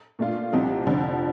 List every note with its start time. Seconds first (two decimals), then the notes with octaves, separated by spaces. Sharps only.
0.19 A#2 A3 D4 F4
0.53 C2 C3 F3 C4 D#4
0.86 F1 F2 D3 F3